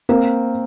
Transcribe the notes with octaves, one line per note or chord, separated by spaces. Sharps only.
A#3 C4